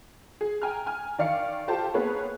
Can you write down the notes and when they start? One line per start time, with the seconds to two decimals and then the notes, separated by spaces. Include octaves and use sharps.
0.41 G#4
0.62 G5 G#5 A#5 F6
0.86 G#5 F6
1.19 D#3 D5 F5 C#7
1.68 F4 G4 A4 C5 A5
1.94 A#3 B3 G#4 B4 C#5